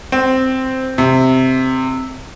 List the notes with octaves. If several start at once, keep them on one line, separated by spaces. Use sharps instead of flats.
C4
C3